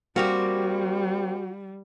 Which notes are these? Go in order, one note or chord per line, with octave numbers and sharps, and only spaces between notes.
G3 A#3 C4 F#4 G4